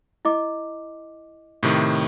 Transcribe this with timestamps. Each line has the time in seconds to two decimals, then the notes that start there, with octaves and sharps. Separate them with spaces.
0.25 E4 D#5 D6
1.63 A2 C3 D#3